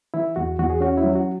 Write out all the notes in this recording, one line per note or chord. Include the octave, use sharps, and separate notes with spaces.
E3 E4
E2 F#4
E2 F#4
G#4
C#4 F#4
E4
F#3
F#4